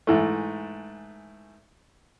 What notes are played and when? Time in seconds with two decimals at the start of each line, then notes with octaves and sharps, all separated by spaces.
0.07 G#2 E3 A3